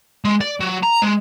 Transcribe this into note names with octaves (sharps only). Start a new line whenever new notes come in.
G#3
D5
F#3
A#5
G#3